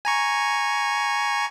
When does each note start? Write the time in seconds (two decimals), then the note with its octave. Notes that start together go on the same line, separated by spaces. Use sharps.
0.05 G#5 A#5 C#6